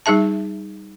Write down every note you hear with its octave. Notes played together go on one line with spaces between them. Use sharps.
G3 D#4 G#4 E5 A5